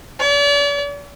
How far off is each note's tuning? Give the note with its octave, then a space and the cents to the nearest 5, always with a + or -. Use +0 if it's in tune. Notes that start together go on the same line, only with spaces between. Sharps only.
D5 -40